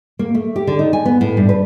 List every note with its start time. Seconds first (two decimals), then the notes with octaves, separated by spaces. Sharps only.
0.19 A#3
0.35 A3
0.56 G4
0.67 D3
0.79 D#4
0.93 G#5
1.05 B3
1.21 A2
1.37 G2
1.49 B4